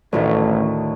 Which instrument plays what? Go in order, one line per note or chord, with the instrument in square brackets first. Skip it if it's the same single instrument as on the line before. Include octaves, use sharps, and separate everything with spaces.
[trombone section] A1 [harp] D2 A2 D#3